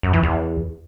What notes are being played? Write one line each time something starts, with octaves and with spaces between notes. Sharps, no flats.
F#2
E3
E2